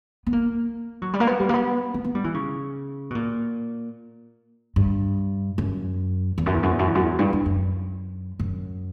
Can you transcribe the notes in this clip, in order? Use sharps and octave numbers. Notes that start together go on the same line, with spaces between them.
B3
A#3
F#3
G3
A#3
B3
G3
A#3
B3
B3
B3
G3
E3
C#3
B2
A#2
G2
F#2
E2
F#2
E2
F#2
E2
F#2
E2
F#2
E2
G2
G2
F#2
F#2